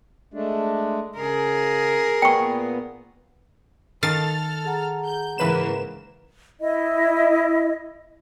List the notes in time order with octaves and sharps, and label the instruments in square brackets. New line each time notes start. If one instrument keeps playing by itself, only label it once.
[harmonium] G#3 A3 D4
[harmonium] C#3 [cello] G#4 A#4
[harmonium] A#2 B3 [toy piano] G5 C#6
[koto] D#3 F5 [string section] A4 F6 [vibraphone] A5 [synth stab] A6
[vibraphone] G#4 F#5 A#5
[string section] G6
[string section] G#2 C#3 A#3 [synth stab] E3 B4 E7
[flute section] E4 D#5